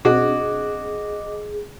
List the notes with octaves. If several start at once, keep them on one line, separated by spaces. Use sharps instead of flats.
B2 C4 D4 F#4 G#4 D#5 D6